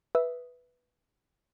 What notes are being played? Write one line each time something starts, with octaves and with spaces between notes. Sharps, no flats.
B4 E5 D#6 E6